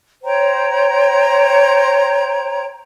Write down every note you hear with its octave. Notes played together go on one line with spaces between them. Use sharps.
C5 C#5 G5 A#5